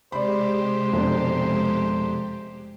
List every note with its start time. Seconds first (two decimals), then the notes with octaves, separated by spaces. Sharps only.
0.12 C3 G#3 G4 C5 D5 B5
0.93 F1 B2 D4